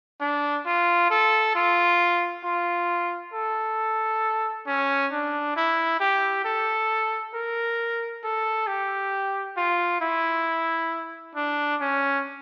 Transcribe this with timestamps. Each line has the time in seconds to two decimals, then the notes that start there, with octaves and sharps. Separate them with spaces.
0.21 D4
0.66 F4
1.10 A4
1.55 F4
2.44 F4
3.34 A4
4.67 C#4
5.12 D4
5.57 E4
6.00 G4
6.45 A4
7.34 A#4
8.24 A4
8.68 G4
9.57 F4
10.01 E4
11.35 D4
11.81 C#4